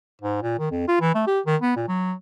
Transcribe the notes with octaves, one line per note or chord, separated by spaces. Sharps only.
G#2
A#2
D#3
F2
F4
E3
A3
G4
D#3
B3
A#2
F#3